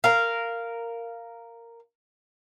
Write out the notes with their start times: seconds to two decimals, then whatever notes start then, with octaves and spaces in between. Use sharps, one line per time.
0.04 A#4 F5